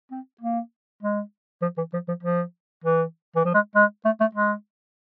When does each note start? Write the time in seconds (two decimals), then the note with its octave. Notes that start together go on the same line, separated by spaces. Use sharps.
0.11 C4
0.41 A#3
1.02 G#3
1.62 F3
1.77 E3
1.93 F3
2.08 F3
2.23 F3
2.84 E3
3.36 E3
3.45 F3
3.54 G#3
3.75 G#3
4.05 A3
4.20 A3
4.35 G#3